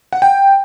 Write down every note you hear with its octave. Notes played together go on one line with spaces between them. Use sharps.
F#5
G5